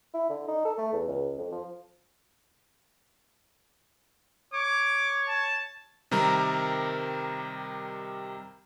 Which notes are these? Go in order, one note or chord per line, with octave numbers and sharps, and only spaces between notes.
E4
D3
D#4
A4
A3
E2
C#2
F2
F3
C#5 D6
A5
C3 D#3 G3 A#4 A#5